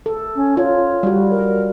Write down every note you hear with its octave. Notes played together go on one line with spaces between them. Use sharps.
A4
C#4
F4 C#5
G3 F#4
A#4